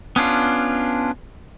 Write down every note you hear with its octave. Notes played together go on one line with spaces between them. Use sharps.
B3 C#4 D4 F4